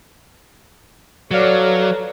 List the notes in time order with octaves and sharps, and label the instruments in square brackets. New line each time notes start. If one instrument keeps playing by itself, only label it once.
[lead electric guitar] F#3 [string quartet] A4 B4 C#5 [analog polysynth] D5 F5